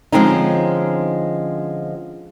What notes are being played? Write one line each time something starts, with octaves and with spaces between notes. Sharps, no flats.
D3 F3 G#3 C4 C#4 D#4